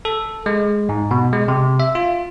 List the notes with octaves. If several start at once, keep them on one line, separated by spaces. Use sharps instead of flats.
A4
G#3
G#2
B2
G#3
C3
E5
F4